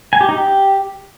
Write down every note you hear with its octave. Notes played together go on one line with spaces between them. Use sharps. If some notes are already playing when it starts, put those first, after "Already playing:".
G#5
G4
D#4
G4